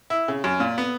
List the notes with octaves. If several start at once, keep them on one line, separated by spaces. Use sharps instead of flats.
E4
C#3
F#2
A#2
B3